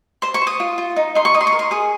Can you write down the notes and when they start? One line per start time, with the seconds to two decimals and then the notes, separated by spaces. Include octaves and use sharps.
0.22 C5 C6
0.34 C#6
0.42 C5
0.47 D#6
0.60 F4
0.78 F4
0.96 D#4
1.15 D#4 C6
1.25 C#6
1.34 D#4 D#6
1.41 C6
1.47 C#6
1.52 A#4
1.59 C6
1.71 G#4 D#6